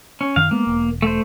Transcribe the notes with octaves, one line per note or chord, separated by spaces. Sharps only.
C#4
F#2 D#3 F5
G#3 A#3 B3
E1
A3 C5